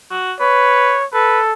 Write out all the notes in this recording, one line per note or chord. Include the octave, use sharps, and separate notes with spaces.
F#4
B4 C#5
A4 B4